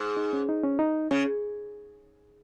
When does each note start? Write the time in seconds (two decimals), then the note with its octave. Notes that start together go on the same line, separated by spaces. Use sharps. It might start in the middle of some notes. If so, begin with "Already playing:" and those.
Already playing: G#2
0.17 D#4
0.33 C#4
0.49 D#4
0.63 C#4
0.79 D#4
1.11 C#3 C#4